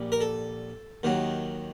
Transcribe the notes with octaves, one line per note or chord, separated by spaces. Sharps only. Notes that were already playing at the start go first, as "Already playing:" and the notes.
Already playing: A#1 A#2 G3
A#4
A4
D#2 D#3 F#3